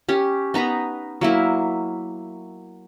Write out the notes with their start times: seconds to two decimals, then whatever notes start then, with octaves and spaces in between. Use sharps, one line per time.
0.09 C#4 G4
0.54 B3 D#4 A#5 B5
1.21 F#3 A#3 E4